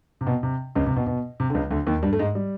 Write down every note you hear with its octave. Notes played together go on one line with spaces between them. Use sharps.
C3
B2
C3
C#2 C#3
C3
B2
B2
C3
D3
C#2 C#3
D2 D3
D#2 D#3
G2 G3
A3
G#2 G#3
G3